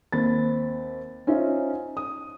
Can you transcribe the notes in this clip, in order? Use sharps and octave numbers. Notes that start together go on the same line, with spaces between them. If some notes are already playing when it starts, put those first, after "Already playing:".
D#2 C4 B5 A6
C#4 D#4 F4 C5 E5
D#6